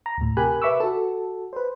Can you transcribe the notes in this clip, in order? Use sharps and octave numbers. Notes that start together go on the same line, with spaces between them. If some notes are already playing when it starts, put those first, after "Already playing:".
A#5
D2 A2
C3 G4 A#4 G#5 B5 F#6
B4 E5 B5 C#6 D6 E6
F#4 A4
B4 C5